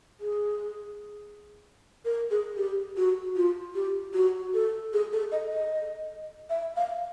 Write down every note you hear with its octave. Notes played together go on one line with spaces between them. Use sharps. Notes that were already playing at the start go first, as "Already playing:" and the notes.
G#4
A#4
G#4
G4
F#4
F4
G4
F#4
A4
G#4
A4
D#5
D#5
E5
F5